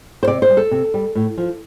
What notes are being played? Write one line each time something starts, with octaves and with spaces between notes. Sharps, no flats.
C5
C3 D5
C5
G3
A4
C3
G3
A2
F3